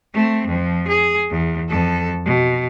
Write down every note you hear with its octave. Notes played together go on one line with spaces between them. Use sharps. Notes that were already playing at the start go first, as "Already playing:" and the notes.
A3 C4
F2 F3
G#4
E2
F2 A4
B2